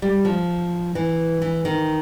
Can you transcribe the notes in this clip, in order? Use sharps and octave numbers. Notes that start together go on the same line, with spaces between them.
G3
F3
E3
E3
D#3